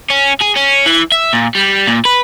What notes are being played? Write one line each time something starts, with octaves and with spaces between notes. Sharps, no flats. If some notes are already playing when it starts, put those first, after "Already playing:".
C#4
G#4
C#4
E3
E5
A#2
G3
A#2
B4